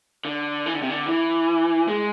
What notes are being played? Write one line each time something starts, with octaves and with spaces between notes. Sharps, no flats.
D3
E3
D3
C3
D3
E3
G#3